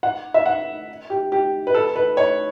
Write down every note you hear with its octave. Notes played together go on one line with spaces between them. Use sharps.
F#5
E5
F#5
G4
G4
B4
A4
B4
C#5